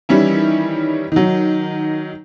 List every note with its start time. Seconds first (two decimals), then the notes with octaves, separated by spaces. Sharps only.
0.09 D#3 E3 G3 C#4 E4
1.12 D#3 F#3